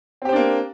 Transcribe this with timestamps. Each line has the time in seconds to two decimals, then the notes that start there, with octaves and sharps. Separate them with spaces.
0.22 C4
0.25 G4
0.29 C5
0.32 D4
0.36 A#3